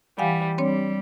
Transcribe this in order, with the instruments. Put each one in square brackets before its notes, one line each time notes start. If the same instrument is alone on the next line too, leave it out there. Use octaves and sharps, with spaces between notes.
[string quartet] E3 G3 [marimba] F5 F#5 G#5
[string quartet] G3 [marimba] C4 D4 C#5